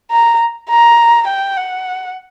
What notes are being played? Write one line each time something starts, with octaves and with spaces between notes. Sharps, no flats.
A#5
A#5
G5
F#5